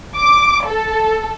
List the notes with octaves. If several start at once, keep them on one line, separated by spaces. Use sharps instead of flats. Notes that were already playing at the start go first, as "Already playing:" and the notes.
D6
A4